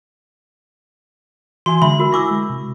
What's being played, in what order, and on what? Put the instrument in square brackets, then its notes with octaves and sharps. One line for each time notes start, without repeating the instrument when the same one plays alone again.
[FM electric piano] E3 E5 G#5 [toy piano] F#4 [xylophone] C6
[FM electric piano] D3 G#3 [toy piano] E5 [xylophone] B5
[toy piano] F#4 A#4
[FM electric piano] E4 G#5 A#6 [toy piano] C#6 D6 E6
[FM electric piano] G#3
C3